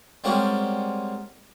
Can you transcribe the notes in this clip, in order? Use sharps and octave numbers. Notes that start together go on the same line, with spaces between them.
G3 G#3 A#3 C4 C#4 F#4